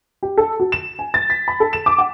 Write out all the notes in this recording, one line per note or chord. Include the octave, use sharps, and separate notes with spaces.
G4
A4
F#4
E7
G#5
A6
B6
B5
A4
E7
D6
F#5